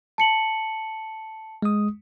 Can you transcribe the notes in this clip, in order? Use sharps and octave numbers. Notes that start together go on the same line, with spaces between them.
A5 C#7 F#7
G#3 D#6